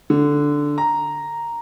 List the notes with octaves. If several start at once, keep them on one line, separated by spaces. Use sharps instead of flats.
D3
A#5